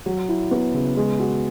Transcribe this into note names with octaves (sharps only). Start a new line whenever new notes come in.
F#3
E4
B3
C#3
G#3
F#4